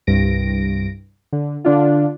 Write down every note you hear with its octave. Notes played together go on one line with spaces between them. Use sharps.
C2 G2 A#6 D7
D3
D3 D4 F4